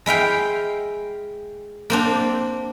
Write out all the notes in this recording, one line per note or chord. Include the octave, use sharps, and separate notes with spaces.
G#3 E4 F5 G5
A#3 C4 D4